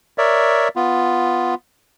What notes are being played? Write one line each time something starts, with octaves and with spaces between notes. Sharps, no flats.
A#4 C#5 D5 E5
B3 F4